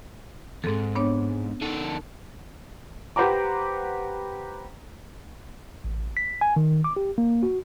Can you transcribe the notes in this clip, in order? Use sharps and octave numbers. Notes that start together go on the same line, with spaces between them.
E2 G#2 C4 G#4 A4
B3 D4 C#5
D#3 A4
G4 B4 C5 F#5 A#5 D6
A1
B6
G#5
D#3
D6
G4
A#3
F#4